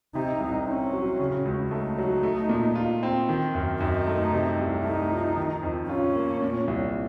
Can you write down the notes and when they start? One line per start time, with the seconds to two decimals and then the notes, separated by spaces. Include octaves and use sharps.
0.15 C3 D#4
0.40 C2
0.68 C4 C#4
0.93 F#3
1.20 C#3
1.45 C#2
1.71 A3 D#4
1.98 F#3
2.23 A3
2.49 A#2
2.76 F4
3.03 C4
3.29 D#3
3.55 F#2
3.80 F#2 D#4
4.07 A3
4.32 C3
4.59 C2
4.84 A3 D#4
5.11 F3
5.37 D#3
5.63 F2
5.89 C#4 F4
6.16 A#3
6.42 A#2
6.68 C2